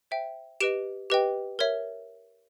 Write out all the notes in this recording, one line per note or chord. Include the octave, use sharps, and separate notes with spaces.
C5 E5 G5
G4 B4 D#5 D7 E7
G4 B4 D#5 G5
A#4 C#5 E5